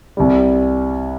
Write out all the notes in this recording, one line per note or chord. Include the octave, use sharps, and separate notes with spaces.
C2 C3 G3